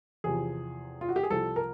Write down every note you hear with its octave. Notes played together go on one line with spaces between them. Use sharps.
E2 C3 F3 G#4
F4
F#4
G4
G#4
C2 C3 F3 A4
A#4